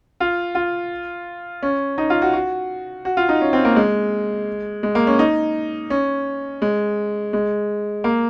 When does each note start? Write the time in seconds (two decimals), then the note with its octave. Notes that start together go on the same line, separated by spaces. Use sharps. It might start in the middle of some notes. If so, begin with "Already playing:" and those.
0.20 F4
0.55 F4
1.62 C#4
1.98 D#4
2.10 F4
2.22 F#4
2.33 F#4
3.05 F#4
3.17 F4
3.29 D#4
3.41 C#4
3.53 C4
3.65 A#3
3.76 G#3
4.83 G#3
4.95 A#3
5.07 C#4
5.19 D#4
5.90 C#4
6.62 G#3
7.33 G#3
8.04 A#3